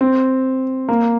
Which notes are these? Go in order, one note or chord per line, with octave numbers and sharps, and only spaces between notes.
C4
A#3